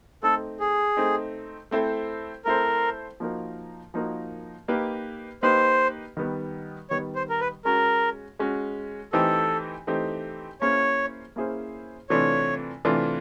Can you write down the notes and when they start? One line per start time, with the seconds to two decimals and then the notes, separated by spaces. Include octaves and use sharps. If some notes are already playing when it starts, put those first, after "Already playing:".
0.23 A3 C4 D#4 A4
0.60 G#4
0.97 A3 C4 D#4
1.71 A3 C4 E4 A4 C5
2.45 A3 C4 E4 A4 A#4 C5
3.20 F3 A#3 D#4 F#4 A#4
3.94 F3 A#3 D#4 F#4 A#4
4.68 A#3 D#4 G4 B4
5.43 A#3 D#4 G4 B4 C5
6.17 D#3 G3 B3
6.90 D#3 G3 B3 C#5
7.15 C5
7.29 A#4
7.41 B4
7.65 G#3 C#4 F#4 A#4
8.39 G#3 C#4 F#4
9.13 E3 A3 C4 D#4 G4 A4
9.87 E3 A3 C4 D#4 G4
10.61 A#3 C#4 E4 G#4 C5 C#5
11.36 A#3 C#4 E4 G#4 C5
12.10 C3 E3 A3 D4 F4 C#5
12.85 C3 E3 A3 D4 F4